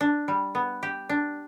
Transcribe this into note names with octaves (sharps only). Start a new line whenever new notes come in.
D4
G3
B3
G4
D4